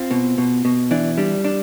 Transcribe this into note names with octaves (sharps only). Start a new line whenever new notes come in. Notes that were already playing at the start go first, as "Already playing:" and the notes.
Already playing: C4 F4
B2
B2
B2
E3 D4
G3 D4
D4